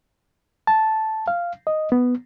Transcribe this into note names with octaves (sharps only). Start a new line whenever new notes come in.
A5
F5
D#5
B3